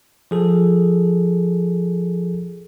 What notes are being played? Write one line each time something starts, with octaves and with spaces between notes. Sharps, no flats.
F3 G#4 A4